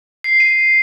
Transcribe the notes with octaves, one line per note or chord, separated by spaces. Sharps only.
C7
D#7